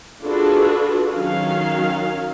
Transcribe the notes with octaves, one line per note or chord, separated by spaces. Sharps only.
D4 F4 F#4 G#4 A4 B4
D#3 F#3 C#4 F5